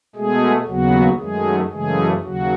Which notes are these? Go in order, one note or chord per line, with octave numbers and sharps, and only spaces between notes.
B2 G#3 A3 G#4
D#2 C#3 F#3 B3 F#4
F#2 D#3 F#3 G#3 A3 G#4
F#2 C#3 E3 G#3 A3 G#4
D#2 C#3 F#3 F#4